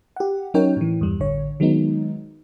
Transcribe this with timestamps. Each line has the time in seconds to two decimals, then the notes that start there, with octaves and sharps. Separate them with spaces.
0.16 G4 F#5
0.54 F#3 C#4 D#4 A#4 C#5 G5
0.77 A2 E3
1.01 E2 G2 G3
1.20 A1 D3 C#5
1.60 D#3 F#3 G#3 B3 D#4